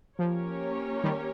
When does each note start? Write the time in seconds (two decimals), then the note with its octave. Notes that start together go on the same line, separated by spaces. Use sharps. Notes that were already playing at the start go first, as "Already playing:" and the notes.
0.18 F3 A#3 C#4 G4 A#4 C#5
1.04 D#3 G3